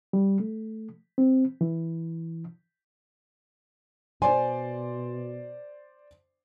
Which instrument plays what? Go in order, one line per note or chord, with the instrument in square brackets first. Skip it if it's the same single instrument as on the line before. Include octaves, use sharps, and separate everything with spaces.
[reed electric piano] G3
A3
C4
E3
[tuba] B2 [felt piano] C5 D5 C6 [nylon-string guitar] G#5